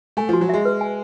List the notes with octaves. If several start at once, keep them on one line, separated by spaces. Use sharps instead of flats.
A3 G#5
F3 F#4
F#3
G#3 E5
B4
G#5